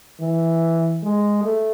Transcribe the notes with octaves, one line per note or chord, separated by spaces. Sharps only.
E3
G#3
A3